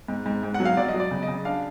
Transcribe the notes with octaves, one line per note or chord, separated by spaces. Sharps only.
G#2
G#2
G#2
F#5
F#3
F5
F#3 D5
D#5
F#3
D5
C#3
D#5
C#3
D4 F5